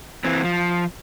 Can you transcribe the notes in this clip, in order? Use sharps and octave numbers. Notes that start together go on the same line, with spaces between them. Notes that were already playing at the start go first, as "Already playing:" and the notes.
E3 C4
F3